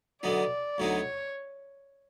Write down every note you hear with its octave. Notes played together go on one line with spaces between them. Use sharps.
D2 D3 F#3 B3 D#4 D5
D2 D3 F#3 B3 D#4 C#5